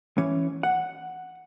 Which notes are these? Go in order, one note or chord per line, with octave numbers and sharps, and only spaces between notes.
E3 C#4
F#5